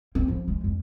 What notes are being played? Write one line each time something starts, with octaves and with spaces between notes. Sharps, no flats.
C4
F3
G#3
F2